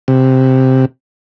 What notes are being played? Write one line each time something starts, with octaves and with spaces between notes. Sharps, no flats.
C3